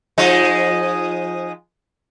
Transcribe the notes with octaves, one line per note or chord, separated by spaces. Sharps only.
F3 G#3 D#4